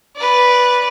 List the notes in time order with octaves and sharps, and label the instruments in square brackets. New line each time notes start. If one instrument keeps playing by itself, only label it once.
[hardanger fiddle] B4 D5